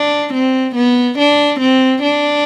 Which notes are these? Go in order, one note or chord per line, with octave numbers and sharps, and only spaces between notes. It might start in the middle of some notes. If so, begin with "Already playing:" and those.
Already playing: D4
C4
B3
D4
C4
D4